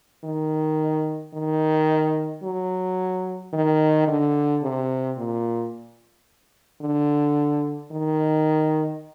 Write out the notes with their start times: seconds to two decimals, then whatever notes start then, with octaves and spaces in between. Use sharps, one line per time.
0.24 D#3
1.34 D#3
2.43 F#3
3.53 D#3
4.08 D3
4.62 C3
5.17 A#2
6.82 D3
7.92 D#3